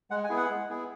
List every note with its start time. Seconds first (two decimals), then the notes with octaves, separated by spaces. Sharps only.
0.11 G#3 F#5
0.24 G#5
0.30 B3 E4 G#4
0.37 F#5
0.49 G#3
0.69 B3 E4 G#4